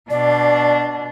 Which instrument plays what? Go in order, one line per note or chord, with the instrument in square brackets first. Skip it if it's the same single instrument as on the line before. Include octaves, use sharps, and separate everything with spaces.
[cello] B2 D4 [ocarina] D5